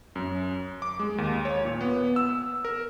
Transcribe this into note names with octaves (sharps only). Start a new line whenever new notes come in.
F#2
D6
G#3
D#2
C#5
A#2
B3
E6
A#4